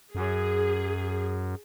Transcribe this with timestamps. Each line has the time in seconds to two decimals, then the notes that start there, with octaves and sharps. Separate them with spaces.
0.15 F#2 G#4